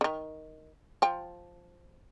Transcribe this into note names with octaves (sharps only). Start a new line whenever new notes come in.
D3 D#3
F3 G5